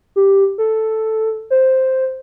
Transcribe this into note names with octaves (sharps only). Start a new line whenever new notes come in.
G4
A4
C5